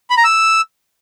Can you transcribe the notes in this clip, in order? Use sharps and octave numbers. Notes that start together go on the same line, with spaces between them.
B5
A#5
E6